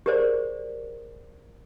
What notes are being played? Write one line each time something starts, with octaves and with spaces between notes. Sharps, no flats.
G4 G#4 A#4 C5 D5